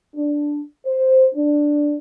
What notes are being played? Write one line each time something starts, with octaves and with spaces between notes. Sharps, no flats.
D4
C5
D4